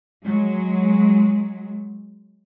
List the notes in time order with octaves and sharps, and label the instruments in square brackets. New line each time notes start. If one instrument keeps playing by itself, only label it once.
[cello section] F#3 G#3